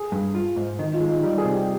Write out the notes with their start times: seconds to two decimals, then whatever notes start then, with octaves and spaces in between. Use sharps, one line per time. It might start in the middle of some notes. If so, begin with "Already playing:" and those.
Already playing: G#4
0.12 G2
0.35 F4
0.56 G#2
0.79 D#3 D#4
0.93 F4
1.01 G#3
1.08 D#4
1.23 G3 D#4
1.38 G#4
1.44 C3
1.52 G4